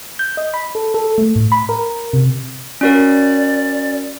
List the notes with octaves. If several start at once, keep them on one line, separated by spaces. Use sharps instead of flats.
G6
D#5
B5
A4
A4
A3
A2
B5
A#4
C3
C#4 F#4 A#4 D5